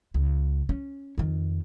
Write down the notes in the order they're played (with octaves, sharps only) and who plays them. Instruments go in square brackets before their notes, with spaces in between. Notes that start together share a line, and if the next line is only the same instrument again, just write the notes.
[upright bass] C#2
C#4
F2 D#3